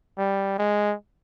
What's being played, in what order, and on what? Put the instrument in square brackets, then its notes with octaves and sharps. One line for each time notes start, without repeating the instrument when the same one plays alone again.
[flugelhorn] G3
G#3